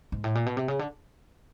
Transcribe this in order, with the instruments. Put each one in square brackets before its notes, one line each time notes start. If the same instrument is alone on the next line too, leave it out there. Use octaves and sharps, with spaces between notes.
[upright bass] G#2
A2
A#2
B2
C3
C#3
D3